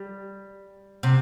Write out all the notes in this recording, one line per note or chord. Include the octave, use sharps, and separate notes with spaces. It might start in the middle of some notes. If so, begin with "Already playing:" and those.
Already playing: G3
C3